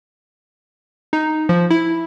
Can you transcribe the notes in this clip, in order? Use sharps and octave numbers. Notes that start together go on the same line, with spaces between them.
D#4
F3
E4